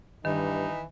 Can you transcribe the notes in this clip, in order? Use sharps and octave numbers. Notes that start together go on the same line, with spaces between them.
G2 D#3 E3 D#4